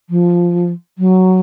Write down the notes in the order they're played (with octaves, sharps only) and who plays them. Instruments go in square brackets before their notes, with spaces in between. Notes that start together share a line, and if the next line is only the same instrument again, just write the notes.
[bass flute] F3
F#3